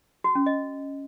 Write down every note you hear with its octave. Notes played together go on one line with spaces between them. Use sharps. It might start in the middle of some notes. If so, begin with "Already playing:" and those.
F#4
C#4
D#5